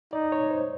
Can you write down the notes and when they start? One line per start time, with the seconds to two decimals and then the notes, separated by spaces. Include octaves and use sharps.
0.13 D#4 D5
0.32 C#5
0.51 C5